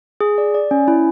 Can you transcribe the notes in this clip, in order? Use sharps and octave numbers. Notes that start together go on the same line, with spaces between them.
G#4
D5
D5
C#4
E4